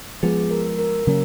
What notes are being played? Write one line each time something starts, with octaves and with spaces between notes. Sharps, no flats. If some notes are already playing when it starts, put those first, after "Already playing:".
F3 G#3 B3 G#4
A#4
A#4
C#3 F#3 A#3 C#4 A#4